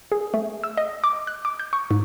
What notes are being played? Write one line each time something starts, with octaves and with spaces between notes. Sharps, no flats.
G#4
A3
E6
D#5
D6
F#6
D6
G6
C#6
G#2